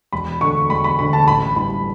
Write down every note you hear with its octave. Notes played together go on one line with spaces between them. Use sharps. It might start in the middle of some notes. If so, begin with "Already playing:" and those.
E1 B5
D2 D3 C#6
E1 B5
B5
D2 D3 B5
A5
A1 B5
G2 E3 B5